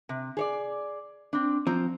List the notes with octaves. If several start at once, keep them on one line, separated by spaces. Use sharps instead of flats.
C3
G#4 C#5 D5
C4 D4
F3 C4 A#5